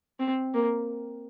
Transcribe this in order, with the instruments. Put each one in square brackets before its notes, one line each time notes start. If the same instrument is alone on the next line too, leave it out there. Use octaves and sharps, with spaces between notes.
[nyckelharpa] C4
A#3